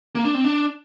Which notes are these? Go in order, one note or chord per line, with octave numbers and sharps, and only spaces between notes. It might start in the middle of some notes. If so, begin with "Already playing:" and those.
A#3
D4
C4
D4